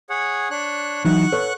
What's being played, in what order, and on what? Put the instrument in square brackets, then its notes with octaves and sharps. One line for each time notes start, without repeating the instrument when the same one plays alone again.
[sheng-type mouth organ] G#4 C#5 F#5
D4 C#5 F#6
[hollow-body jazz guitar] E3 F#3 D#4 [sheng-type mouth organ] F#5 C#6 F#6
[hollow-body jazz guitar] A4 B4 C#5